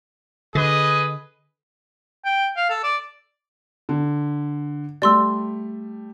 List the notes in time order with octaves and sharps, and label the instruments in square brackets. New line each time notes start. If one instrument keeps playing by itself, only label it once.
[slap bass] D3 [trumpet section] G#4 B4 D#5
[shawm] G5
F5
A4
D5
[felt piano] D3
[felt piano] G3 A3 [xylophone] D5 C6 E6